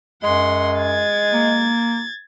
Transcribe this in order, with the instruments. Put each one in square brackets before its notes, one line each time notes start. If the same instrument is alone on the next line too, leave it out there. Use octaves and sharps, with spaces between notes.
[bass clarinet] F#2 [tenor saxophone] G#3 [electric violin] F#5 C6
[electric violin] G#6 A6
[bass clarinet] A#3